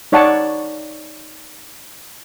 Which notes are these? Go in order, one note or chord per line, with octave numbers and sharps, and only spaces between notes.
D#4 C#5 D5 F#5 A5